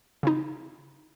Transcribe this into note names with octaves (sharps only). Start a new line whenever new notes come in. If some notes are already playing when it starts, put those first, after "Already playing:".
C#3 C4 D#4